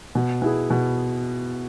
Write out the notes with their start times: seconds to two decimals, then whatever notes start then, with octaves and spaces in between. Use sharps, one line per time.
0.15 B2
0.42 B3 E4 G#4
0.70 B2